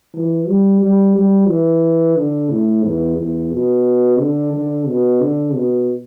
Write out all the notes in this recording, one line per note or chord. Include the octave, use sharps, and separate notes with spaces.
E3
G3
G3
G3
E3
D3
A2
E2
E2
B2
D3
D3
B2
D3
B2